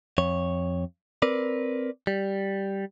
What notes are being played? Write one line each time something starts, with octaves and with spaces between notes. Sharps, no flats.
F2 C#5
C4 A#4 B4 D5
G3